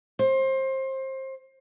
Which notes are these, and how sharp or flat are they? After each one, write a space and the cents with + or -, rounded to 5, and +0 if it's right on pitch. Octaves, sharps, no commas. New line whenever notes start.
C5 +25